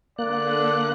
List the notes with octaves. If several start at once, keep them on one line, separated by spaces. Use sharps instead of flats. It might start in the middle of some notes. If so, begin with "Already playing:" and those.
D3 A#3 D5 F#6